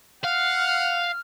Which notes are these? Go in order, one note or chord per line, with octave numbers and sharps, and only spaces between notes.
F5 F#5 F6